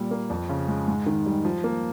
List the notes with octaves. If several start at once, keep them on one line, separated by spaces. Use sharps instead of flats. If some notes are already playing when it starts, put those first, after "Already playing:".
Already playing: A#2 G3
A#3
F2
C#3
G#3
G#2
D#3
G3
F3
A#3